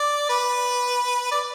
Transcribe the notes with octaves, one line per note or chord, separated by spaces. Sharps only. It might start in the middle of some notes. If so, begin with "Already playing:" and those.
Already playing: D5
B4
D5